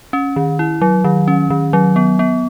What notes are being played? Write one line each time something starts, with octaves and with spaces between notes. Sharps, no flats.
C#4
D#3
E4
F#3
D#3
C#4
D#3
F#3
B3
B3